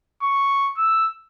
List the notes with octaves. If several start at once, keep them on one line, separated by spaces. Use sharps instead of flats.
C#6
E6